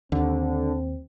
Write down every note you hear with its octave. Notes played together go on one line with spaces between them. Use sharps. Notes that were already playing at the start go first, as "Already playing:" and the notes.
D#2 D3 C4